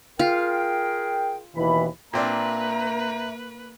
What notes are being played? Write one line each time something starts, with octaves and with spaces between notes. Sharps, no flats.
F4 G#4 A#4 G5
D#2 B2 E3 B5
A#2 A#3 C4 D4 B4 E5 A#5